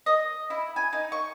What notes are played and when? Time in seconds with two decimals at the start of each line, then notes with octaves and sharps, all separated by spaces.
0.06 D#5
0.50 E4
0.76 G#5
0.93 D#4
1.12 C#6